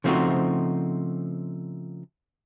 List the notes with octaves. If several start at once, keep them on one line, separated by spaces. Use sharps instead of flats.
C#3 F3 A3 C4 D#4 F#4